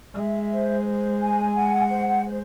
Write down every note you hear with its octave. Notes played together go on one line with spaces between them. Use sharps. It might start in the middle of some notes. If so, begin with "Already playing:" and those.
G#3 E5
C5
C5
G#5
F#5
C5
C5